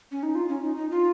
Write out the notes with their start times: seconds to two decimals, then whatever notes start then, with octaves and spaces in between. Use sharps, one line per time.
0.12 C#4
0.23 D#4
0.35 F4
0.48 C#4
0.63 D#4
0.76 D#4
0.91 F4